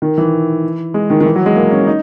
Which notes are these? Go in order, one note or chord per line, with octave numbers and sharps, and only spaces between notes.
D#3
E3
G#3
D#3
D#3
E3
F#3
G#3
A#3
C#4
D#4